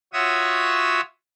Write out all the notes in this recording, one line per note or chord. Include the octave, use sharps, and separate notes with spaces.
F4 F#4 C#5 E5 D#6 E6